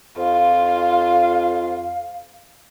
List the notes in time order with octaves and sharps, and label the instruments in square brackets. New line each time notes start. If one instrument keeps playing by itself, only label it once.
[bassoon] F2 [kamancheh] F4 [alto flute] F5